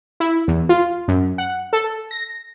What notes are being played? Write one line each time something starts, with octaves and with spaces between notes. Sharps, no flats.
E4
E2
F4
F#2
F#5
A4
A#6